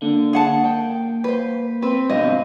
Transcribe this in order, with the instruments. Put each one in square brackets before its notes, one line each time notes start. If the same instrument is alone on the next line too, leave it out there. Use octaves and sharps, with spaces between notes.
[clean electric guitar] D3 [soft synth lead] A#3
[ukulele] G#4 F#5 A5
[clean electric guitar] G5
[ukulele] B4 C5
[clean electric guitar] C4 [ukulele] B4
[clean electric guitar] G2 B2 C4 [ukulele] D#5 [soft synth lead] F5